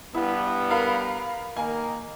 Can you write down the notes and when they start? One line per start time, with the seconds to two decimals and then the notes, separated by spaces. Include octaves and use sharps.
0.14 G2 B3 E4
0.70 A#4 F5 B5
1.57 D#3 A#3 G#5